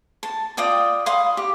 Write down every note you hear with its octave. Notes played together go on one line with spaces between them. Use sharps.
A5
F4 D5 G5 D#6
F5 B5 C6 D#6
G4